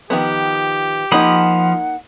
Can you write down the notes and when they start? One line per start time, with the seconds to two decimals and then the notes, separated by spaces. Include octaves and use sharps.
0.10 D#3 F3 B3 G4
1.12 F3 A#3 D#4 F#5 B5 D#6